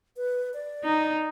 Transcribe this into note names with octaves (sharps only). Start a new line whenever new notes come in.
B4
D5
D#4